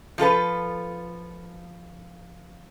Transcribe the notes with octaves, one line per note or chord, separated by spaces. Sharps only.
F3 F4 A4 B4